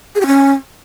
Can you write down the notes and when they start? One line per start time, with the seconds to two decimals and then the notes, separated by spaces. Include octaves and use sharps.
0.15 G#4
0.21 G4
0.26 C#4